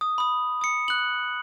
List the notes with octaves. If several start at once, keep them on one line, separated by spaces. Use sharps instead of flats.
D#6
B5 D#6
D#6 C#7
F#6 F#7